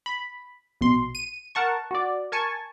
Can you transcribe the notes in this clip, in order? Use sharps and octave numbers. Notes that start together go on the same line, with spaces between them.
B5
A#1 B2 C6
D#7
A#4 F#5 A5 C#6
F#4 D5
A#4 G#5 A5 C#6